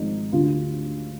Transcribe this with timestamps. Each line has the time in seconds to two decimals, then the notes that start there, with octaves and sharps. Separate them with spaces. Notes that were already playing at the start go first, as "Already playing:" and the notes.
Already playing: G#1 G#2 F3 D#4
0.32 D2 D3 G3 F4